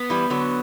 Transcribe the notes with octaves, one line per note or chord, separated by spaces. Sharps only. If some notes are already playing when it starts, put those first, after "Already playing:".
Already playing: B3
E3 G3
D3 F#3